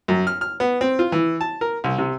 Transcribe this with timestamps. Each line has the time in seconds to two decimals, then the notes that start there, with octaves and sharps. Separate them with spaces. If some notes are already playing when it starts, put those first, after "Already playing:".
0.08 F#2
0.27 F6
0.41 F6
0.60 B3
0.81 C4
0.99 F4
1.12 E3
1.41 A5
1.61 A#4
1.84 C2
1.98 C3